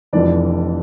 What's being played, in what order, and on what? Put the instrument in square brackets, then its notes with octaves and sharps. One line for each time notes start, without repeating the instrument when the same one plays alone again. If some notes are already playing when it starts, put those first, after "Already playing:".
[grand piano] F1 F2 E3 D4 D5